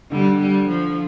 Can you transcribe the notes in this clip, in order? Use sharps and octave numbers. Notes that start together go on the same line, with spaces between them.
D3 G3
G3
F3